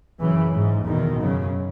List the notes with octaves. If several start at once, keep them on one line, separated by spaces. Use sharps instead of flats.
F#2 C#3 E3
G#2
E2 B2 D#3
F#2 C#3